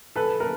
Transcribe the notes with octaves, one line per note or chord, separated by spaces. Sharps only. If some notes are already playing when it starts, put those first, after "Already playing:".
A4 B4
A#4